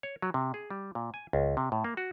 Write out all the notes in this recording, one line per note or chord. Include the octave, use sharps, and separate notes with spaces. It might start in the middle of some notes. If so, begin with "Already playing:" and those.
C#5
F#3
C3
G#4
G3
A#2
G#5
C#2
C3
A2
A#3
F#4